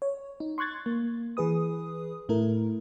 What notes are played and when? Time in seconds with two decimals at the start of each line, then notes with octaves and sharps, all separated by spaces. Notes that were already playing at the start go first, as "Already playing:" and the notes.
0.02 C#5
0.40 D#4
0.58 C6 C#6 F#6 G#6 A6
0.86 A#3
1.37 E3 G#4 B4 D#6
2.29 A2 A3 E4 A#4